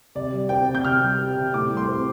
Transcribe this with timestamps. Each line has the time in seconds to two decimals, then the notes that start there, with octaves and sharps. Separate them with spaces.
0.15 C3 D5
0.32 G3
0.49 C4 G5
0.68 C3
0.75 G6
0.84 C3 F6
1.01 G3
1.19 C4
1.36 C3
1.54 A2 D6
1.71 G3
1.77 C6
1.89 C4